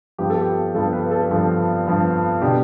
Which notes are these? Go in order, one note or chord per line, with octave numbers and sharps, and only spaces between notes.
G2 F3 B3 G4
A4
G4
G2 F3 B3 A4
B4
A4
G2 F3 B3 A4
G2 F3 B3
B2 B3 D4 G4